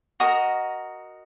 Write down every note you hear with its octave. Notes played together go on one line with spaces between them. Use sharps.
F#4 A#4 D#5 D#6